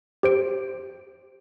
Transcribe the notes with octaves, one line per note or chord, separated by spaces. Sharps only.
G4 C5 D7